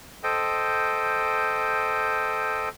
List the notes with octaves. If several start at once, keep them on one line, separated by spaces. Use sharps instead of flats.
A4 C5 D#5 G5